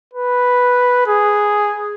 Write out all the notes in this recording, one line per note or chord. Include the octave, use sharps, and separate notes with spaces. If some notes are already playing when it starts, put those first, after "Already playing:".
B4
G#4